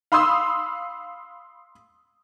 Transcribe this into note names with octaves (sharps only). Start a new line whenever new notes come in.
F5 B5 C6 D#6 E6